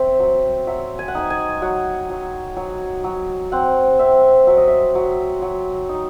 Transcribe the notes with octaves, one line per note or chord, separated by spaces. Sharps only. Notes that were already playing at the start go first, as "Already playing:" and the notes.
Already playing: C4 C5 E5
F#3
F#3 E5
G#5
F#5
D#4 G#5
G#5
F#3 F#5
F#3
F#3 G#5
F#3
C4 F#5
C4 E5
F#3 E5
D#5
E5
F#3
F#3
D#4